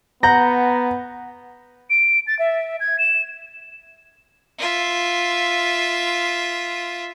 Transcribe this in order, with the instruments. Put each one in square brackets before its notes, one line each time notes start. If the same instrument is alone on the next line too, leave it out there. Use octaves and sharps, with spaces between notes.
[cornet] B3 [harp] F#5 G6 A#6 [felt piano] A#5
[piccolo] D7
A6
E5
G#6
E7
[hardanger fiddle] F4 E5